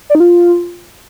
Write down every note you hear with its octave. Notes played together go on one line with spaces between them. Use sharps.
D5
D#4
F4